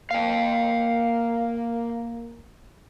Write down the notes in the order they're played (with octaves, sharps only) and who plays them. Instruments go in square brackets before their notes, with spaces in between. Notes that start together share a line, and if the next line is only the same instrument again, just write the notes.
[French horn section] A#3 [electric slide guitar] F5 G5